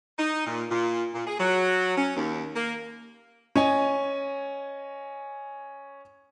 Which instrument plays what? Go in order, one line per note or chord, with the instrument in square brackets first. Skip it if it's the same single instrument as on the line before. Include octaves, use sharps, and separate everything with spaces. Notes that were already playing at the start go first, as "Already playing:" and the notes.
[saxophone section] D#4
A#2
A#2
A#2
G#4
F#3
C#4
D#2
A#3
[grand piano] C#4 D#5 G#5